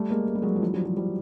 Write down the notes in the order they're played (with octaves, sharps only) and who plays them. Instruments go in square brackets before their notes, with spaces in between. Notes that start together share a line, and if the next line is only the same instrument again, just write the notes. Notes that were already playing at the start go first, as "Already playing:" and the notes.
Already playing: [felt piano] G3 A3
G#3 A#3
G#3
G3
F#3 G#3
F3
E3 F#3
F3 G3
F3 G3
F3 G3